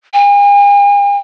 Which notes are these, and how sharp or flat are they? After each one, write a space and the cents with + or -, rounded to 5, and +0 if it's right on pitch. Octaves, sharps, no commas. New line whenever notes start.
G#5 -45